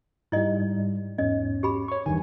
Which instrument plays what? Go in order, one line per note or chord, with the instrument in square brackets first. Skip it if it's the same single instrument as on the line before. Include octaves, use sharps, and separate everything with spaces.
[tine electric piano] G#2 G3 [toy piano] E4 D#5
[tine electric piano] E2 G#2 [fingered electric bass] C#4 [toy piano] D#5
[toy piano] G4 G#4 B5
[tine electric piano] C#5 C#6
[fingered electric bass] E2 G2 D#3 [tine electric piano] G#5